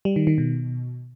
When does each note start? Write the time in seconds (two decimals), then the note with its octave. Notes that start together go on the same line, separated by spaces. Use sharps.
0.05 G3
0.16 D#3
0.27 D#3
0.38 B2